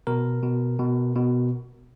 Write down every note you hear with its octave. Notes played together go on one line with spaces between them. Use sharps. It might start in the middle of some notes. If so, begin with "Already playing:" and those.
B2 A#4
B2
B2
B2